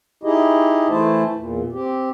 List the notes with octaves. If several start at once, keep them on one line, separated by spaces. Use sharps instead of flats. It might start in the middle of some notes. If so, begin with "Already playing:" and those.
D#4 E4 G4 G#4 D#5
E3 A3 E4 C5 A5
E2 A#2
C4 G4